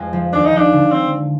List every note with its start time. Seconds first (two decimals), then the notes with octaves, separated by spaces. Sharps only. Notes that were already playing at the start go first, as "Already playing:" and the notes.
Already playing: F2 G#3
0.13 F3
0.33 D#2 D4
0.45 D#4
0.53 F3 D4
0.72 D3
0.92 C4